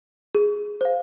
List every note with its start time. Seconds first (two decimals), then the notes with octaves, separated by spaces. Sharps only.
0.35 G#4
0.81 C5 F5